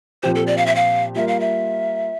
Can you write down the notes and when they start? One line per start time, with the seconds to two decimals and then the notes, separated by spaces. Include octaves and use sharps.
0.23 A#2 F3 C4 G4 C5
0.35 A4
0.47 D5
0.57 F5
0.66 E5
0.75 F5
1.15 G3 A#3 F4 A#4 E5
1.28 F5
1.40 E5